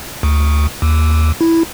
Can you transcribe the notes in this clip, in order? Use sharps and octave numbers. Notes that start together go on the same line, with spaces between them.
D2
D#2
E4